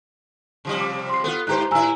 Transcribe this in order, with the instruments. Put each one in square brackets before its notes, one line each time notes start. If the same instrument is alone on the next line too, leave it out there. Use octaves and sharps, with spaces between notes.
[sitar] C3 F3 G3
[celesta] D6
C6 C7
[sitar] B3 F4 [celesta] A4
[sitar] G#2 G4 C5 [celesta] B4 A#5 F#6
[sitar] A2 E4 [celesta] G#5 A#5 E6